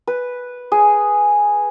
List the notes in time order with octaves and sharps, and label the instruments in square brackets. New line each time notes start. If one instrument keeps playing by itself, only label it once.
[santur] B4
G#4